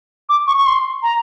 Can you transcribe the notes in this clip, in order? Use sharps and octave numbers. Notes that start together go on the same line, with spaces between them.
D6
C#6
C#6
C6
A#5